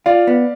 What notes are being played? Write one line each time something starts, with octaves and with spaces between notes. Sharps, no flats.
F4 D5 F5
B3